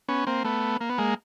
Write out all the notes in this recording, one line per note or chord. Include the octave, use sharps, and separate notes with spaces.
B3 C#4
A#3 C4
A3 B3
A#3
B3
G#3 A#3